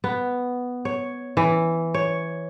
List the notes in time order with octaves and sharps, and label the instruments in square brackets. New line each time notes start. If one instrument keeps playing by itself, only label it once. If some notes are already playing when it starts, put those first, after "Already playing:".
[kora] B3
C#5
E3
C#5